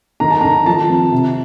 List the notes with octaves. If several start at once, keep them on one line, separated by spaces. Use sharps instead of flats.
D#3 A#5
A5
A#5
D#3
F3 A5
C4
C3